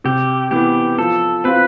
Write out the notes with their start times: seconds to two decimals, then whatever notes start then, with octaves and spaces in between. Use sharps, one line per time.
0.04 C3 G4
0.51 E3 B3 G4
0.99 F3 A4
1.44 C4 F4 B4